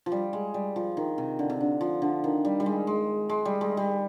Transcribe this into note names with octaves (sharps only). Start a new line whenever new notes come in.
F3
G3
G#3
G3
F3
D#3
C3
D3
C3
D3
F3
D3
D#3
G3
G3
G#3
G#3
G#3
G3
G#3
G3